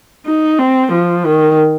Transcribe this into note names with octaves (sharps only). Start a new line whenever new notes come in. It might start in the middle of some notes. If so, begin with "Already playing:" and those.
D#4
C4
F3
D#3